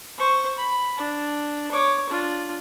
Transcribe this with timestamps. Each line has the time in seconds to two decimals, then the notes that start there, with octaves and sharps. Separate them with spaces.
0.18 C5 C#6
0.58 B5
0.97 D4
1.72 C#5 D6
2.09 D4 F4